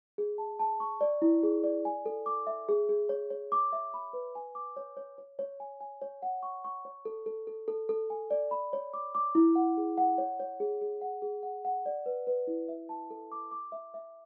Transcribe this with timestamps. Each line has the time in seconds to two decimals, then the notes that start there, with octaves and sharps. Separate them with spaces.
0.18 G#4
0.38 A5
0.59 A5
0.80 C#6
1.01 D5
1.22 E4
1.43 G#4
1.64 D5
1.85 G#5
2.06 A4
2.26 D6
2.47 E5
2.69 G#4
2.89 G#4
3.09 C#5
3.30 C#5
3.52 D6
3.73 E5
3.94 B5
4.13 B4
4.35 G#5
4.55 D6
4.77 C#5
4.97 C#5
5.18 C#5
5.39 C#5
5.60 G#5
5.81 G#5
6.02 C#5
6.22 F#5
6.43 C#6
6.64 C#6
6.85 C#5
7.05 A4
7.26 A4
7.47 A4
7.68 A4
7.89 A4
8.10 G#5
8.31 D5
8.51 B5
8.73 C#5
8.93 D6
9.15 D6
9.35 E4
9.55 F#5
9.77 G#4
9.98 F#5
10.18 C#5
10.40 C#5
10.60 G#4
10.81 G#4
11.01 F#5
11.22 G#4
11.43 F#5
11.65 F#5
11.86 D5
12.06 B4
12.27 B4
12.47 E4
12.69 E5
12.89 A5
13.11 A4
13.32 D6
13.51 D6
13.72 E5
13.94 E5